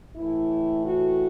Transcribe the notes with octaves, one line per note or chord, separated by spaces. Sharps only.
A2 E3 A3 E4
F#4